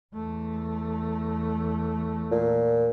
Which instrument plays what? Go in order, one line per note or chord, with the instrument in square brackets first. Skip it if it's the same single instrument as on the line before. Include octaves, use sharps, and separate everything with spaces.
[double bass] E2 A3
[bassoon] A#2